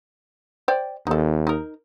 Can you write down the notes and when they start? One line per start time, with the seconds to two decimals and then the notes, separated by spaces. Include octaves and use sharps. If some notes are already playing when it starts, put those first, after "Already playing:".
0.68 C5 D5 G5
1.07 D#2 D#4 A4
1.47 D#4 A#4